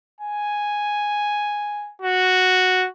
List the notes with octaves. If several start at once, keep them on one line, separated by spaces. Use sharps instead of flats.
G#5
F#4